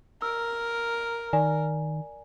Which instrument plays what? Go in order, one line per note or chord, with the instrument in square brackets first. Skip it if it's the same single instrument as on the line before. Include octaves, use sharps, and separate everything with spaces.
[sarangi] A#4 [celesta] E6
[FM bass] D#3 [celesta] D5 G#5